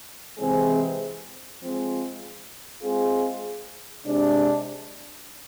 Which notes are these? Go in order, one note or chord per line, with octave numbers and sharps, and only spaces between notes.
C3 E3 G#3 C4 G#4
F3 G#3 C4
G#3 C4 F4 G#4
C3 G#3 D4